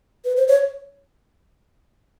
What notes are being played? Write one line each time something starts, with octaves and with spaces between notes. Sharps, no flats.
B4
C5
C#5